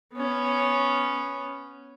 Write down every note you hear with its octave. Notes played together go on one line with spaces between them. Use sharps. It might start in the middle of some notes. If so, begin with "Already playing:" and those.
B3 C#4